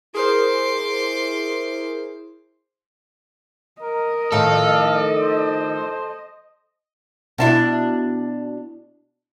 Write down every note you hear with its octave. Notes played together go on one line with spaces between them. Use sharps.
E4 G#4 A#4 C5 C6 D6
A#4 D#5
A2 D#3 F3 A4 F5
C5
B2 D4 E4